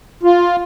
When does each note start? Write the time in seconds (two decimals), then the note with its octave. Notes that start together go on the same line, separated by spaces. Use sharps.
0.23 F4